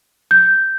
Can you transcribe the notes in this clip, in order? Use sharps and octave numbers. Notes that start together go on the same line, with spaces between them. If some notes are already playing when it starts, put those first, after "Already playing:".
G6